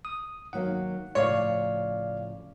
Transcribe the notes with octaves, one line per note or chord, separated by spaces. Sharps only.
D#6
D#3 F#3 A#3 F#5
A2 C#3 F3 C#5 D5 F5